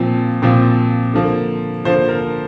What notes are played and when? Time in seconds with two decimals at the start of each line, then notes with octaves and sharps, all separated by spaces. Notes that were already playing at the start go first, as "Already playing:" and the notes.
Already playing: A#2 F3 C4
0.42 A#2 F3 C4
1.14 D3 F3 A#3
1.84 D3 F3 A#3 C5
2.09 A#4